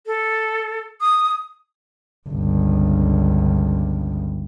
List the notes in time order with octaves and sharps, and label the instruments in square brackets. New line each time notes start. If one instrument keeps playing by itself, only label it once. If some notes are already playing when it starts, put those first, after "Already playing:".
[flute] A4
D#6
[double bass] G1 C#2